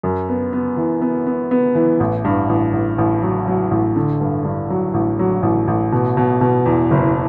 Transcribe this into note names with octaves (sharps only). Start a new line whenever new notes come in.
F#2
B3
B3
E3
B3
B3
B3
E3
A1
G2
A1
A1
A1
F#3
F#3
A1
D3
G2
G2
F#3
A1
F#3
A1
A1
B2
B2
B2
E2
F#1